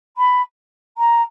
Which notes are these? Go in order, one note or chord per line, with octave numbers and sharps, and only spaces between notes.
B5
A#5